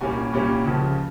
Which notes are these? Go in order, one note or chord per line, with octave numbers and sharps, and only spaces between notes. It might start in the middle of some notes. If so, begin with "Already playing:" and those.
C2 A#2 G3 A#3 C#4 G#5
C2 A#2 G3 A#3 C#4
C#2 C#3 F3